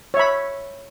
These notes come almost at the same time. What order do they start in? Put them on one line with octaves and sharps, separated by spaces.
C#5 E5 B5